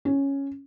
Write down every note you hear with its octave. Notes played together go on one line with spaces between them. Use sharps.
C#4